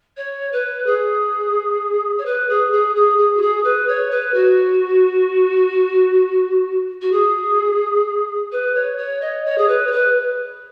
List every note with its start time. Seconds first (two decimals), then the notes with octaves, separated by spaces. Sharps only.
0.17 C#5
0.52 B4
0.86 G#4
2.18 C#5
2.25 B4
2.49 G#4
2.72 G#4
2.95 G#4
3.18 G#4
3.37 F#4
3.41 G#4
3.64 B4
3.88 C#5
4.11 B4
4.34 F#4
7.01 F#4
7.12 G#4
8.52 B4
8.75 C#5
8.97 C#5
9.21 D#5
9.45 C#5
9.58 G#4
9.68 B4
9.87 C#5
9.91 B4